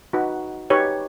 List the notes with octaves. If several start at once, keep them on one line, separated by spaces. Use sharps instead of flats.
D#4 F#4 B4
D#4 G4 B4 C#5